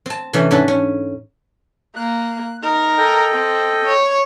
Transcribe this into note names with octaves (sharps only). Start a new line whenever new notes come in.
C4 A5
C3 E3 A3 C#4 D4
G#2 C#4 D4 A4 B4
C#4
A#3 F#6
D#4 A#4
A4 D#5 G5
C4
C#5